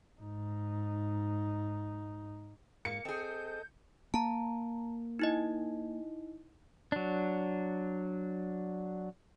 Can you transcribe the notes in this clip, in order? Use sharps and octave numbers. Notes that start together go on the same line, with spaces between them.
G#2 D#4
G#2 A#3 C#7
C4 G#4 A4 D#5 G6
A#3 A5 A#5
D#4 E4 D#5
F#3 D4